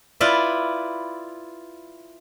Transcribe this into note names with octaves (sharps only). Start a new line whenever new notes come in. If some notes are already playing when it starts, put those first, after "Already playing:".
E4 F4 B4 D5